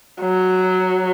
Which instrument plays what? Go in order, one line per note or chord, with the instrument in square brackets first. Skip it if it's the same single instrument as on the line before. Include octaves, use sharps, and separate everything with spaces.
[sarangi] F#3